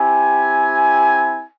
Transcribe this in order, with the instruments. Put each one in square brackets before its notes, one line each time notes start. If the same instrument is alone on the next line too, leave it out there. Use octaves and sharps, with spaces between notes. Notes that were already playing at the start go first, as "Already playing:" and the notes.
Already playing: [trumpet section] C4 E4 G4 G#5